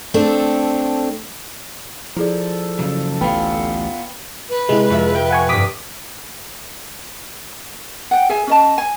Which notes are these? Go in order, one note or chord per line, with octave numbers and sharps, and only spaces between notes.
A3 C4 D4 A4
F3 E4 G#4 A4 D5
C#3 F#3
A1 D2 B3 F4 B4 G5 B5
B4
C3 G#3 E4
F2 E5
G5
F#5 G#5 C#6
G2 C3 D6 D#6 B6
F#5 G5
G#4 E5 G#5
C#4 D#5 A5
G#5